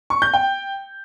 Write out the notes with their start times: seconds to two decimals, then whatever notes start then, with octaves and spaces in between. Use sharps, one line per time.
0.10 C#6
0.22 G6
0.34 G5